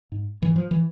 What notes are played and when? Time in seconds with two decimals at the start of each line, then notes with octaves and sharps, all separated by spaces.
0.12 G#2
0.42 G#2 E3
0.56 F3
0.71 E3